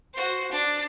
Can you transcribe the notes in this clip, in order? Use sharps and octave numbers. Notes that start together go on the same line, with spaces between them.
F#4 C5
D4